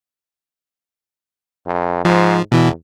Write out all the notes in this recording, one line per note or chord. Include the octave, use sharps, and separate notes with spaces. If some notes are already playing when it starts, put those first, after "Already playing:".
F2
G#2 F3
E2 B2 E3